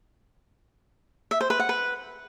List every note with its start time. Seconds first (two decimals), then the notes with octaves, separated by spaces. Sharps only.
1.31 E5
1.41 C5
1.50 B4
1.59 F#5
1.69 B4